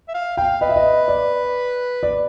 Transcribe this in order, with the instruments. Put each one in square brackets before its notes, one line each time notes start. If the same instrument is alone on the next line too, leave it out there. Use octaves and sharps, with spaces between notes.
[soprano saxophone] E5
F5
[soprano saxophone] F5 [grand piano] G5
[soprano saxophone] B4 [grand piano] D#5
[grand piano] E5
D#5
D5
D5